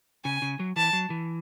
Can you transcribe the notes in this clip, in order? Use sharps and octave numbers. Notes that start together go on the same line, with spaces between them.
C#3 G#5
C#3
F#3
E3 A5
F#3
E3